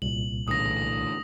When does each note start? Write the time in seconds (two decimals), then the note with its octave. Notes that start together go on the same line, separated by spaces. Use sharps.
0.02 C2 A#2 F#7
0.48 A2 D3 E3 D#6 A#6